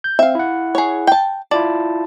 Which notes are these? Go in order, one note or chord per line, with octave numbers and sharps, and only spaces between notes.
G6
C4 E5 F5
E4 F#5
G#4 C#5
G5 A5
E4 F4 D5 A5